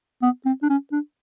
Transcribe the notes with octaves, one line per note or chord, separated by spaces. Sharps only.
B3
C4
D4
C#4
D4